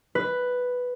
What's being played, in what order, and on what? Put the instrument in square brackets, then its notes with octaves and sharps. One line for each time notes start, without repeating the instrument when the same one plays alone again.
[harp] B4